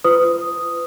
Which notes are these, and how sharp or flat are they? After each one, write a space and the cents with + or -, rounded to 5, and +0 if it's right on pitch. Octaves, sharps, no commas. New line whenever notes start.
F4 -25 B4 +35 D#6 +0